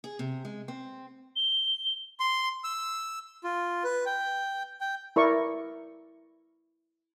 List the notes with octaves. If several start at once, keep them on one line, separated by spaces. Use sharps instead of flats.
G#4
C3
G#3
C4
G7
C6
E6
F4
B4
G5
G5
E4 A#4 D5 C#6